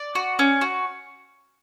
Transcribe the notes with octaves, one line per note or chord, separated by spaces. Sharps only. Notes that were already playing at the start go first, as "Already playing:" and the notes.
Already playing: D5
F#4
C#4
F#4